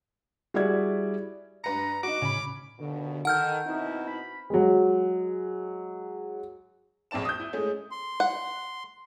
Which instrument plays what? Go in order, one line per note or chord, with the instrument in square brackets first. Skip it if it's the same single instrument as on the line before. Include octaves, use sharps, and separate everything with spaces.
[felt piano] G3 E4 F#4 G#4 D5 G#6
[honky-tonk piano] G2 B4 C#7 [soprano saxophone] A#5
[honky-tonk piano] D#4 F#4 [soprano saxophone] D6
[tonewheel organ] A2 C#3 [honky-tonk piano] C#4 B5
[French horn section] D#2 B2 [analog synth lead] D3
[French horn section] D#3 [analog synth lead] A4 [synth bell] F#5 F6 G6
[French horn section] B2 C4 E4 [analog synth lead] D#4
[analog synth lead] B5
[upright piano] F#3 G#3
[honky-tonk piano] A#1 F2 D5 A5 E7
D#6 G6
E4
G#3 A3 C#4 G#4
[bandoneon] C6
[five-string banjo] F#5